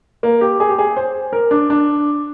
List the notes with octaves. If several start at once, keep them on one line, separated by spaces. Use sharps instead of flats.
A#3
G4
G#4
G4
G#4
C5
A#4
D4
D4